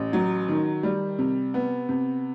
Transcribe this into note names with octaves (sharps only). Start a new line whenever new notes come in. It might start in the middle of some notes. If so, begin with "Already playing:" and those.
Already playing: A1
F#3
D#3
G3
C3
B3
C3